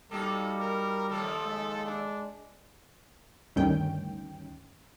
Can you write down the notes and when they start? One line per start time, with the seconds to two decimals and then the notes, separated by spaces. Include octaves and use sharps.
0.11 G3 A#3 D#4 F#4 A4
0.59 A#4
1.10 D#2 F3 A3 A4
1.44 G#3
1.86 D4
3.56 D2 G2 D#3 C#4 G5